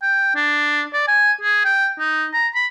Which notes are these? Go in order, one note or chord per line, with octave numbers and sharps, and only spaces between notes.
G5
D4
D5
G#5
G#4
G5
D#4
A#5
B5